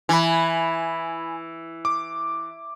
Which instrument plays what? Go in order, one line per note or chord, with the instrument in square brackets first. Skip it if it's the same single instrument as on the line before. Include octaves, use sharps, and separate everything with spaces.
[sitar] E3 [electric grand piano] G#5 B5
[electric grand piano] D6